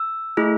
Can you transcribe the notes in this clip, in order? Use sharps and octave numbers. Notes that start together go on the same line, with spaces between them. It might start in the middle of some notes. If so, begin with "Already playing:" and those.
Already playing: E6
A3 E4 G#4